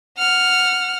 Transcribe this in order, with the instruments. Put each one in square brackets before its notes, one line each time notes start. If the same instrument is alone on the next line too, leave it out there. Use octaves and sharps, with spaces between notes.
[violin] F#5 F6